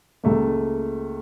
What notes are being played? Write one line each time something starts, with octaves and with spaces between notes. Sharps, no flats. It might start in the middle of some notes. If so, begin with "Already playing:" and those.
C#2 A3 A#3